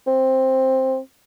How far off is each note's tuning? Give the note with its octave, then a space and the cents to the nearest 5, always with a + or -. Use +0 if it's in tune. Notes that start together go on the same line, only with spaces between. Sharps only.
C4 +10